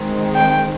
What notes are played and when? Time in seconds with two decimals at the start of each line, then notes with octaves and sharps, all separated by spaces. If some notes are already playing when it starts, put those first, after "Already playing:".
Already playing: D#3 G#3 C4
0.35 G5